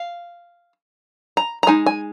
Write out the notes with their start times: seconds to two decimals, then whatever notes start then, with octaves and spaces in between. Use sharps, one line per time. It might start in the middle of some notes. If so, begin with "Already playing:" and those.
Already playing: F5
1.37 A#5
1.63 A#5
1.67 G#3 D#4 G#5
1.86 G#5